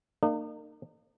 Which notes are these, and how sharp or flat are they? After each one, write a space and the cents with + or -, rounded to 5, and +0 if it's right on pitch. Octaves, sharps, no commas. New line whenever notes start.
A#3 -30 D#4 -45